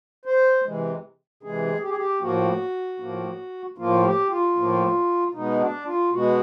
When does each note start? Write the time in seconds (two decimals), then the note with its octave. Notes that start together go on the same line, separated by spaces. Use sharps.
0.25 C5
0.65 C3 E3 G#3
1.43 C3 E3 G#3 G#4
1.82 G4
1.89 G#4
1.97 G4
2.21 A2 F3 A#3 F#4
3.00 A2 F3 A#3
3.78 A2 F3 A#3 F4
4.04 G4
4.30 F4
4.56 A2 F3 A#3
5.34 B2 G#3 B3 D#4
5.60 D4
5.87 F4
6.12 B2 G#3 B3 F#4